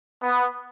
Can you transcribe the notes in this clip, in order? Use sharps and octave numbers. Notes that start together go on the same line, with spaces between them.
B3